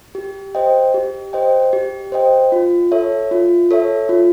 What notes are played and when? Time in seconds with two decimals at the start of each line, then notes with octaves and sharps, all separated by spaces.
0.15 G4
0.55 C5 D#5 G5
0.94 G4
1.33 C5 D#5 G5
1.73 G4
2.12 C5 D#5 G5
2.52 F4
2.92 A4 C#5 E5
3.31 F4
3.71 A4 C#5 E5
4.09 F4